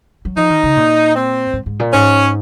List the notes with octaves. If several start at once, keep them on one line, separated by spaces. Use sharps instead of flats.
F#3
F3 D#4
D#3
C#3
A#2
C4
G#2
G#2
A#2
G#2 C#4